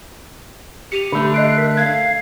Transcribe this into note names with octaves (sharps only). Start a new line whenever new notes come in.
G4 C#7 D#7 F7
D3 A3 B5
D#5 F#6 C7 D7
A#4 B6
F5 G#6